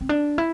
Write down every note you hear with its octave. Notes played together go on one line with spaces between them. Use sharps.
C4
D4
E4